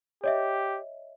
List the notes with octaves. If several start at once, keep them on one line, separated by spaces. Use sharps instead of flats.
G4 C#5 D#5 E5